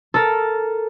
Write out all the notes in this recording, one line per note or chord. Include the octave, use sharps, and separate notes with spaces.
A4 A#4